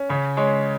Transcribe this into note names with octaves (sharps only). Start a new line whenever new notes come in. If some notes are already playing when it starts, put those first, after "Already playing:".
Already playing: C#4
C#3 C#5
G#3 C#5